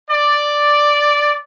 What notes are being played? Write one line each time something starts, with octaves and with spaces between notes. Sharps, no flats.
D5